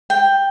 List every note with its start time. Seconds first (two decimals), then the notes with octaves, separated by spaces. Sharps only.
0.10 G5